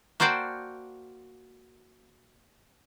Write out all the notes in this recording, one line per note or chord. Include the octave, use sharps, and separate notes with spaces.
A#3 F#4 C5 D5 G5 A5